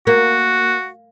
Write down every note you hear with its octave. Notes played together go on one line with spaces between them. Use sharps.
A#3 F#4